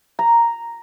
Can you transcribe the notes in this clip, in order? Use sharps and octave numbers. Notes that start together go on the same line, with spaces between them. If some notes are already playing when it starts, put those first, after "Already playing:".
A#5